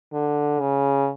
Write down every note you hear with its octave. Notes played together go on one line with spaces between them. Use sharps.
D3
C#3